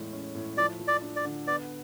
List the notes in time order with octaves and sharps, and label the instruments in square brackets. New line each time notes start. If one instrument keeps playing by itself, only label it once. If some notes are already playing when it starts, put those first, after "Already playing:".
Already playing: [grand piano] E2 A2 G#3
C#4
A2
[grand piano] F3 [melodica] D5
[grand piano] F3
[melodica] D5
[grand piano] D4
[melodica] D5
[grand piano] D3
[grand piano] B3 [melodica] D5